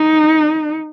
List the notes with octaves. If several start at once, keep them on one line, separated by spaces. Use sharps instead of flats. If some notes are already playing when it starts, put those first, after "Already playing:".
Already playing: D#4